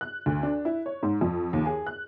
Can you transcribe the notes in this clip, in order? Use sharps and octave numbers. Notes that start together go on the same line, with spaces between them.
F#6
D2
D4
E4
C#5
G#2
F2
D#2
G#4
F#6